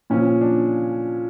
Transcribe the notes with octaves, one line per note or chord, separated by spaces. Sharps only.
A#2 F3 C#4
D4